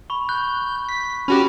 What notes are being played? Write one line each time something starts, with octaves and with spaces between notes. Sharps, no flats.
B5 C#6
F#6 G6
B6
C#4 F#4 G4 B5 F#6